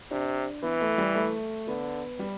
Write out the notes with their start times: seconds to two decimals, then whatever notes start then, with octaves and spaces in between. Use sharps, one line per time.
0.11 C3 D4
0.63 E3 B3
0.81 A3
0.98 G3
1.15 A3
1.67 D3 B3
2.19 G3